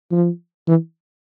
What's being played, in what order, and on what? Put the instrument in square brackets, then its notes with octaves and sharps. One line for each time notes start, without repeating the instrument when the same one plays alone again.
[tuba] F3
E3